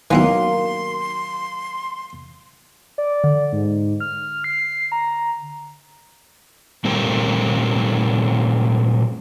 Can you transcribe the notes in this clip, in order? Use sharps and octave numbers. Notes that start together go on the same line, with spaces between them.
D#3 E3 F#3 A#3 B3 E4 C6
D5
D3
G#2
F6
C7
A#5
A#2 G3 A3 C4 G4 A#4